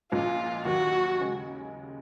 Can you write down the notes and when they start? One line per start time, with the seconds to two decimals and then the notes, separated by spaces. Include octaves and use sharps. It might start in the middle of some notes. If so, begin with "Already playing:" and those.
0.11 A#1 A#2 G#3 C#4 F4
0.65 D#2 D#3 F#3 F#4
1.20 C#3 G#3 C#4